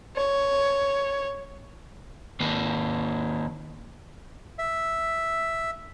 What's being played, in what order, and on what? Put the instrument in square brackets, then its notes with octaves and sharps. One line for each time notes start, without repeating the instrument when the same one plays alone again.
[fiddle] C#5
[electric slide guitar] D#3 A#3 B4
[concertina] E5